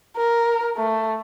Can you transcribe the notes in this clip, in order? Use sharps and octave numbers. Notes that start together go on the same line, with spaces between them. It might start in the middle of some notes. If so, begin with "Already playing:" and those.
A#4
A3